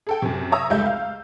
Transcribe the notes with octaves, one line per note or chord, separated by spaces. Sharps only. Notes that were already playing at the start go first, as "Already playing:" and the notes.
G#4 A4 G5
F#2 C3
C#5 E5 A#5 D#6 E6
F1 C#2 G3 G#3 E5 G6
F5